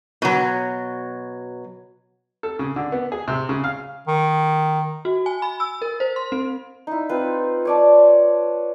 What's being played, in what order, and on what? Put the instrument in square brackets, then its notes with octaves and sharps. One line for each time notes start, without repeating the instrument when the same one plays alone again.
[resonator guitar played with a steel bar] B2 F#3
[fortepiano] A4
C#3
D3
B3
G#4
C3
C#3
F5
[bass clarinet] D#3
[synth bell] F#4
G#5
B5
E6
A#4
C5
C6
C4
[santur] D#4 E4
C4 F4 B4
C#5 D5 A5